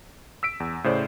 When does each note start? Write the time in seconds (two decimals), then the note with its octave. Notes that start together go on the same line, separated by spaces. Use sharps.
0.43 E6 B6 D7
0.60 E2
0.84 A2 C#3 C5 D5